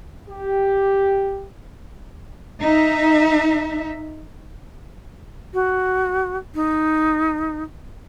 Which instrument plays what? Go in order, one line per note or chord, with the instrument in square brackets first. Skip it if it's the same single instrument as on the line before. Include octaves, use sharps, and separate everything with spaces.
[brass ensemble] G4
[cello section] D#4 E5
[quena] F#4
D#4